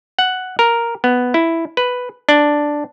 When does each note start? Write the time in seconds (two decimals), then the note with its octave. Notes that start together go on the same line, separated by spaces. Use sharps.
0.19 F#5
0.59 A#4
1.04 B3
1.34 E4
1.77 B4
2.29 D4